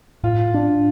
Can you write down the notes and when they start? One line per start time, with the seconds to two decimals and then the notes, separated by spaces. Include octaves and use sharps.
0.23 A2 F4
0.54 D4